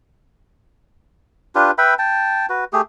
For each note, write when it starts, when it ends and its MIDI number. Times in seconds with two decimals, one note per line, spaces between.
1.55 1.71 62
1.55 1.71 65
1.55 1.71 67
1.55 1.71 71
1.78 1.94 71
1.78 1.94 76
1.78 1.94 79
1.78 1.94 83
1.99 2.46 79
1.99 2.46 81
2.49 2.64 66
2.49 2.64 71
2.73 2.81 57
2.73 2.81 67
2.73 2.81 68